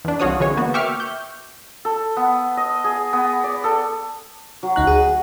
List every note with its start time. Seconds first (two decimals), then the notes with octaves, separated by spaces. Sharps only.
0.05 E2 D4
0.20 C2 F4 F#4 C#5 D#6
0.40 D3 E3 G#3 C#5
0.57 A#3 B3 F#4
0.74 E5 G5 C#6 D6 F6 C#7
1.00 G6
1.85 A4
2.17 B3
2.57 D#5
2.84 G#4
3.13 B3
3.44 D5
3.64 A4
4.63 F#3
4.76 D2 D#4 F#6
4.87 G#4